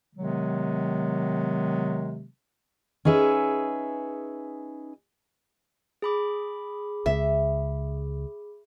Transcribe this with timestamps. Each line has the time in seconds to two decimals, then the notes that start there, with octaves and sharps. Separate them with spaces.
0.15 C3 D#3 F#3 G#3 B3
3.05 C#4 D#4 G#4 B4 E5
6.02 G#4 B5 D6
7.06 C#2 E5